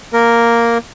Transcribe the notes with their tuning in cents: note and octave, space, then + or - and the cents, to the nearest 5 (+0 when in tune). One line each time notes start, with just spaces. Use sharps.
A#3 +0 A#4 +0